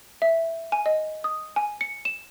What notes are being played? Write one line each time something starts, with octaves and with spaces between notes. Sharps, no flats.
E5
G#5
D#5
D#6
G#5
C#7
E7